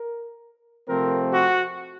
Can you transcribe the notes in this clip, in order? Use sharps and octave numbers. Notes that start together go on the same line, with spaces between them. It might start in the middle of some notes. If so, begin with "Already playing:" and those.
Already playing: A#4
C3 F3 A3 C4 A#4
F#4